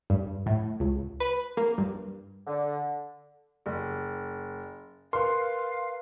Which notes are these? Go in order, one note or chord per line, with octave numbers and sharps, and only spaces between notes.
G2
A2
C#2
B4
A#3
G2
D3
F#1
A#4 B4 F5 C6